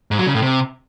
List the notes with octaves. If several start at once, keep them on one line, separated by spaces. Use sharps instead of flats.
G#2
F#3
C#3
A2
C3